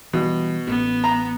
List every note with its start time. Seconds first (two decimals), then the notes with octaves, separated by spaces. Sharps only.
0.13 B2 E3 G3
0.67 A1 B3
1.04 A#5